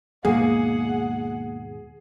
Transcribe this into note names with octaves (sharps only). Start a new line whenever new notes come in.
D#2 G#2 B2 A#3 G#4 F#5